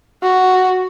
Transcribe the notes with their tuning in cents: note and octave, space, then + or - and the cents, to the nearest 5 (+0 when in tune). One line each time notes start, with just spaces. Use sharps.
F#4 +0